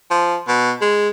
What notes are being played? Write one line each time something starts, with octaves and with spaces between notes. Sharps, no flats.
F3
B2
G#3